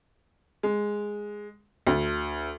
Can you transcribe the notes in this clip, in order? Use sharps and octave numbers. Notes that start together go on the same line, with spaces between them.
G#3
D2